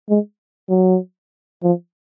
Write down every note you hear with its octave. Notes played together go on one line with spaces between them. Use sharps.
G#3
F#3
F3